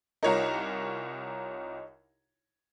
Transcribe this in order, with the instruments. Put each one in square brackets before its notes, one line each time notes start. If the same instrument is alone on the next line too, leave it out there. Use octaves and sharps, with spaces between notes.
[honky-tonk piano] C2 F4 A#4 [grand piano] D#4 C#5 A#5